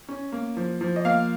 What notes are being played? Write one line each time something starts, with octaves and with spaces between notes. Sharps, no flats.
C#4
A#3
F3
F3
D#5
A#3 F5